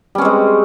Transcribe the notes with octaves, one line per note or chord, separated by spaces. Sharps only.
G3 G#3 C4 C#4